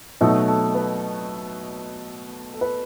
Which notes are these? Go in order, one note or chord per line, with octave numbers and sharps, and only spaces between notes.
B2 F#3 A3 D#4 A4
A4
B4
A4
B4